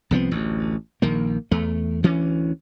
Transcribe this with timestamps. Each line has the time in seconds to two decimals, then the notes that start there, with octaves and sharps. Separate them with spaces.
0.11 C2 F3 B3 C4
0.31 A1 D2
1.02 A#1 D#3 A#3
1.51 E2 A3
2.03 D2 E3 C#4